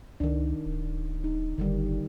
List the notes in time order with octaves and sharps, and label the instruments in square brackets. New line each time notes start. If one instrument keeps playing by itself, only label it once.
[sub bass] C#2 [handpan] D#3 D4
[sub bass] D1
[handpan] D#4
[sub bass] F#1 [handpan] D3 D#3 G3